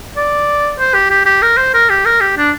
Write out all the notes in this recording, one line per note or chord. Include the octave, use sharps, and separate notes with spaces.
D5
C5
G4
G4
G4
A#4
C5
A#4
G4
A#4
G4
D4